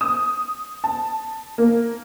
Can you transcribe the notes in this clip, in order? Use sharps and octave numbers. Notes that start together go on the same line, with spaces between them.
D#6
A5
A#3